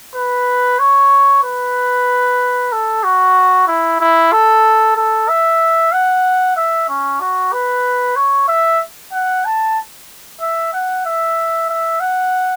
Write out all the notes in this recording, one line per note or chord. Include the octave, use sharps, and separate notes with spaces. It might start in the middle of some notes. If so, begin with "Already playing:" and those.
B4
C#5
B4
A4
F#4
E4
E4
A4
A4
E5
F#5
E5
C#4
F#4
B4
C#5
E5
F#5
A5
E5
F#5
E5
E5
F#5